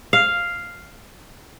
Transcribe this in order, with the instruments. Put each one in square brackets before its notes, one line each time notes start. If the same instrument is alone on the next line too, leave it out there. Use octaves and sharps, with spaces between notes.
[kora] F5